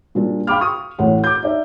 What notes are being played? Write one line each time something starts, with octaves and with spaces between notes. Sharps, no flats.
A#2 G3 D4
F5 G5 B5 D6 F6
C#6 D#6
A1 A2 C#5 F#5
D6 G6
D#4 D5 E5